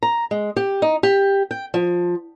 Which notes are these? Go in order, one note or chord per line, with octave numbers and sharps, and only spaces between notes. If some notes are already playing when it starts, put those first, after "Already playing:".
A#5
G#3
G4
D#4
G4
G5
F3